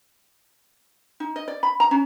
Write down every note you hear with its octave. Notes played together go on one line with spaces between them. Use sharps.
D#4
D#5
D5
B5
A#5
C#4